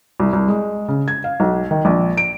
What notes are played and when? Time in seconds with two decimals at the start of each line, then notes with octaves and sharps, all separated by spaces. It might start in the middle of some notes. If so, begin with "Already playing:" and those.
0.20 C2
0.33 C2
0.48 G#3
0.88 C#3
1.08 G#6
1.24 F5
1.40 B1
1.71 D#3
1.85 A#1
2.17 D7